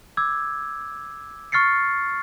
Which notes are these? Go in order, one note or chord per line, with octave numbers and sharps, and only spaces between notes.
D6 E6 G#6
C#6 F6 A6 C7 C#7